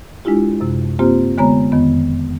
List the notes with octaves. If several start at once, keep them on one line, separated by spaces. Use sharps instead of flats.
G#3 D4 E4 F4 G4
F#2 C3
A#3 C4 F4 G4 C5
D3 G#3 B3 C#5 A#5
F2 D#3 B3